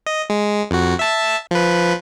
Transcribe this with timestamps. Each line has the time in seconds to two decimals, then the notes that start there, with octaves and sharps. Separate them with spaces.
0.07 D#5
0.30 G#3
0.71 F2 F#4
0.99 E5 A5
1.51 F3 B4